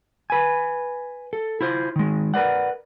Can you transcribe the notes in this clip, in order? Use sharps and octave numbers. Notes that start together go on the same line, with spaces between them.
B4 G#5
A4
E4 F4 C5
D#3 G#3
A#4 B4 D5 F#5